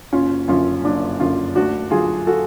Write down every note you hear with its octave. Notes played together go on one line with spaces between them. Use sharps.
F#1 C#4 F4
F#2 D3 C#4 F4
F#1 D4
F#2 D3 C#4 F4
D2 D4 F#4
D3 F#3 F4 G#4
F#4 A4